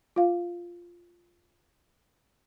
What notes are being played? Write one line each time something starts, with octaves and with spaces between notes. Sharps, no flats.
F4 F5